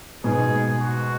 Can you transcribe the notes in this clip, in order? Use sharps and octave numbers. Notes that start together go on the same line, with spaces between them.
G#2 B2 G#4
F#4